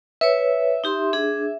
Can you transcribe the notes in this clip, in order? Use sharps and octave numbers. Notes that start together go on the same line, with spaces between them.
B4 C#5 E5
D#4 G4 C6
D4 G#4